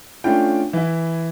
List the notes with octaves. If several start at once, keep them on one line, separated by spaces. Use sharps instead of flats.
A3 C#4 D4 F4 G5
E3 E4